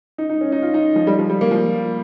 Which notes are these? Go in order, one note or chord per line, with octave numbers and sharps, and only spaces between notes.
D#4
D#4
C#4
D#4
F4
D#4
F3
G3
F3
G3
A#3
F3